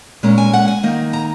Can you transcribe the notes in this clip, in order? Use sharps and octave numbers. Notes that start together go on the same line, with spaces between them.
A#2 G#3 C#4 A#5
G#5
F#5
G#5
D#3 A#3 D#4
A#5